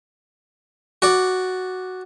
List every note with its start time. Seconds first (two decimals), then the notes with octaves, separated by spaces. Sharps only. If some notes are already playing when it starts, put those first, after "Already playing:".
1.02 F#4 D5